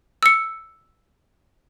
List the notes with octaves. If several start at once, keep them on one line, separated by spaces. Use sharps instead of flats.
E6 C#7